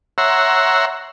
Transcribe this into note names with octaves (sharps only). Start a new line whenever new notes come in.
C#5 E5 F#5 A#5 C6